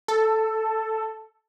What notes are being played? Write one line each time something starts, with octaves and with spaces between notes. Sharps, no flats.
A4